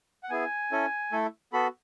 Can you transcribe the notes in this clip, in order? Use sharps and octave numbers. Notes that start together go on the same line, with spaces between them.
F#5
B3 E4 G#4 G#5
C#4 E4 A4
A3 E4 A4
B3 F#4 A4 B5